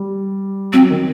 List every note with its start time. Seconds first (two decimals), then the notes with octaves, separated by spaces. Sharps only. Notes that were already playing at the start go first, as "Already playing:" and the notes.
Already playing: G3
0.73 F#3 C4
0.90 D#3